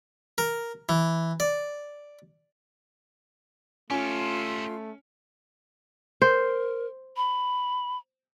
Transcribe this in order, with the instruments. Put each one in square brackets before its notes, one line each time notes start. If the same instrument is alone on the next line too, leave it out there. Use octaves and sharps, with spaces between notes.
[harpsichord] A#4
E3
D5
[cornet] A3 [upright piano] C#4 [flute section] F4 C6 [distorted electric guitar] G4 A4
[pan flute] A#4 [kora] C5
[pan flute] B5